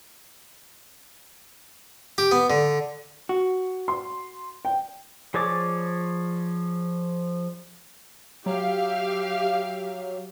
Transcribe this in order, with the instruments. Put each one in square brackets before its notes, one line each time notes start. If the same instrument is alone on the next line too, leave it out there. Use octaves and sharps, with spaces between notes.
[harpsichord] G4
B3
D3
[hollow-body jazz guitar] F#4
[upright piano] C6
G5
[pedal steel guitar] F3 G#4 C#5 D5 D6
[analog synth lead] F#3 [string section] G4 E5 F5